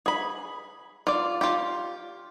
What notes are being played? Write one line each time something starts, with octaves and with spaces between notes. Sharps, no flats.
G#4 B5
F4 D5
F4 G4